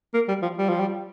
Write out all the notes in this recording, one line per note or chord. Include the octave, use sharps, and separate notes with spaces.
A#3
G3
F3
G3
F3
G3